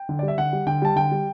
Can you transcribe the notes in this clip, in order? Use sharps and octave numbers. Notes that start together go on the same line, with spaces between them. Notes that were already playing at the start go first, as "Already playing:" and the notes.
Already playing: G5
D3
G3 D5
E5
D3 F#5
G3
D3 G5
G3 A5
D3 G5
G3